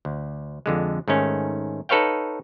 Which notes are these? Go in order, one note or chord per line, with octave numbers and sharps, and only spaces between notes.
D2
F2 D3 G#3
G#2 D#3 A3 C#4
D#4 A4 B4 C#5 F5 G5